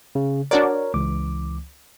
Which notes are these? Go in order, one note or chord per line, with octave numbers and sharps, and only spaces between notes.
C#3
D4 F#4 A#4 C#5 D5
C#2 E3 D6